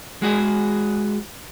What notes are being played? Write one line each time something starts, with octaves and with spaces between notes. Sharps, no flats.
G#3 F#4 G#4